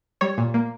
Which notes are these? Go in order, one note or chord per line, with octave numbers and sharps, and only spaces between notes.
G3 C#5 C#6
A#2
A#3